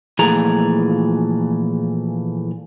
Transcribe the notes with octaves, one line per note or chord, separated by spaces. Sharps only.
A#2 E3 F3 A3 G#4 A#5